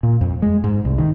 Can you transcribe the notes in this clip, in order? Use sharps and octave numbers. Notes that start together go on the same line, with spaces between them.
A#2
F2
G#3
G#2
C2
D#3